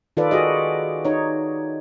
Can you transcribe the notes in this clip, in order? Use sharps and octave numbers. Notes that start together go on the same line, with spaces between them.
D#3 F4 A4 B4 D5
F#4 G#4 D#5
D#4 C#5